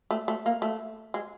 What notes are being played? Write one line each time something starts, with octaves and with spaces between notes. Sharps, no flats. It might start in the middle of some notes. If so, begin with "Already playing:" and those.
A3
A3
A#3
A3
G#3